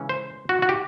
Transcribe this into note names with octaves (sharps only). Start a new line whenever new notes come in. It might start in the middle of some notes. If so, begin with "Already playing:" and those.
Already playing: C#3 E3 G#3 C#4
C5
F#4
F#4
G4